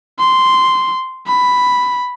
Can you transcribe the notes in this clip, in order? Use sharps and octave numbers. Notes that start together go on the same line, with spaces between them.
C6
B5